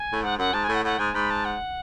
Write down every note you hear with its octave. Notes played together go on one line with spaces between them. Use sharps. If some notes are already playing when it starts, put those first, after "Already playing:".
Already playing: G#5
A2
G#2 F#5
F#2 F#5
G#2 A5
A2 G#5
F#5
A2 F#5
G#2 G#5
G#2 B5
A5
F#5